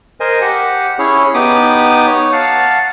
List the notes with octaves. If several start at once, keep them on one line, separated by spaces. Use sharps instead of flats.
A#4 C5 D#5 G#5
G4 F#5
C#4 E4 G#4 C#5
B3 D#4 G4 D6 D#6
C#5
F5 F#5 A5